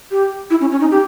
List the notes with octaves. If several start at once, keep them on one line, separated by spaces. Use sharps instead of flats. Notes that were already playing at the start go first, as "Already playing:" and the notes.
G4
E4
C#4
C#4
D#4
G4